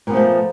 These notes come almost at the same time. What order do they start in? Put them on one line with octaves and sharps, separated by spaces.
A#2 B3 F3 A3